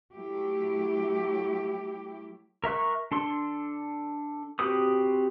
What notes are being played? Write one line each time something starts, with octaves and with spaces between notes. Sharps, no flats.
F#3 A3 E4 G4
A#4 E5 C#6 F#6
D4 A4 C6
C4 F#4 G4 B4 D#6